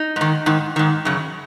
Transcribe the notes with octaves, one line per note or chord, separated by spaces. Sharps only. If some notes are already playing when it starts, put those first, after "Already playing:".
Already playing: D#4
G#2 D#3
G#2 D#3
G#2 D#3
F#2 C#3